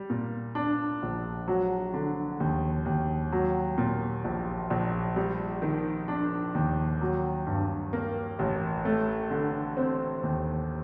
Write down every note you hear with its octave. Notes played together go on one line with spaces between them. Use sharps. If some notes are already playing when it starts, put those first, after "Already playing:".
Already playing: G3
A#2
D4
A#1
F#3
D3
D#2
D#2
F#3
A#2
A#1
A#1
G3
D#3
D4
D#2
F#3
G2
A#3
A1
A3
D3
C4
D#2